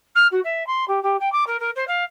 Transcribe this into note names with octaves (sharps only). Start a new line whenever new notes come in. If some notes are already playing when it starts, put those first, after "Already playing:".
F6
F#4
E5
C6
G4
G4
G5
D6
A#4
A#4
C5
F5